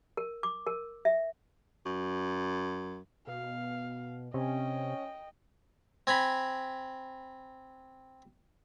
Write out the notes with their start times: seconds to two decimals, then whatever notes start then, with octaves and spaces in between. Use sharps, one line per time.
0.17 A#4
0.43 D6
0.67 A#4
1.05 E5
1.86 F#2
3.27 B2 F5
4.34 C3 C#4 D#5 G5
6.07 C4 G#5 A#5 B5